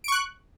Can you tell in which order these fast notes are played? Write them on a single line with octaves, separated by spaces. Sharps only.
D7 C#6 F#6